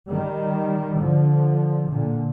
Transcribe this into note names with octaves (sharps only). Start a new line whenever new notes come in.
D#3 G3
D3 F3
A#2 D3